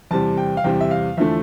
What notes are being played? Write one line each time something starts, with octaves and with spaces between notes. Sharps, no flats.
E2 C3 G3 A5
G5
F5
E2 C3 G3 G5
E5
F5
E2 D3 F3 A3 E5